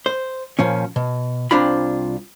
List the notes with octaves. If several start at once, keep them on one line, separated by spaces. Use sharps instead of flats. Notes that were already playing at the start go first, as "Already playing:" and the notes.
C5
A#2 F3 C#4
B2
C2 C4 D4 F4 B5